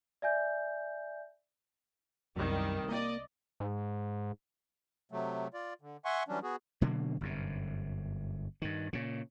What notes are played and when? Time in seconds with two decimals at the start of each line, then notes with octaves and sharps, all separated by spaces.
0.22 D5 E5 G#5 G6
2.36 C2 F#2 D#3 G3
2.89 A#3 D5 D#5
3.60 G#2
5.12 C3 F#3 A3
5.54 F4 D5
5.81 D3
6.05 E5 F#5 G#5 C6 C#6
6.28 E3 F#3 G3 C#4 D4
6.43 B3 F#4 G#4
6.81 B2 D3 F#3 A#3
7.21 G1 F#2 C3
8.62 G2 D#3
8.93 A#2 C#3